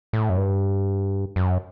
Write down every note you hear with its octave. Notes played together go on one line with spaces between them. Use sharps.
A2
F#2
G2
F#2